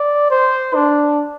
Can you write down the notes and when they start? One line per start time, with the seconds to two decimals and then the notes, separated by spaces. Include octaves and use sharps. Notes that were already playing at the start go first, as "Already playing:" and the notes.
Already playing: D5
0.31 C5
0.75 D4